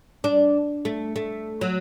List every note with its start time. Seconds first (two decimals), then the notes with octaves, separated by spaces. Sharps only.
0.24 D4
0.85 A3
1.16 A3
1.61 F#3